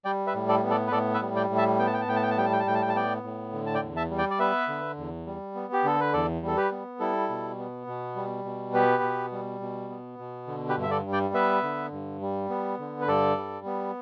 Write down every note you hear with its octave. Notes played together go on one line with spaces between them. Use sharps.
G3 D5 G5
B4 E5
A2
A4 D5
B3
A4 D5
B4
A2 A4 D5
B4 E5
G3
D5 G5
A2
E5 A5
B3 G5
A5
G5
A5
A2 G5
A5
G5
A5
G3 G5
A5
G5
A5
A2 G5
A5
G5
A5
B3 D5 G5
A2
D3
A5
D5 G5
E2
E5 A5
G3
D5 G5
D5
B3 B4 E5
D3
E2
G3
B3
G4
D3 A4
B4
E2 A4 D5
G3
A4
G4 B4
B3
G3 E4 A4
B2
B3
B2
G3
B2
B3 G4 B4
B2
G3
B2
B3
B2
D3
G4 B4
G2
E5
A4 D5
G3
D5 G5
B3 B4 E5
D3
G2
G3
B3
D3
B4
G2 A4 D5
G3
B3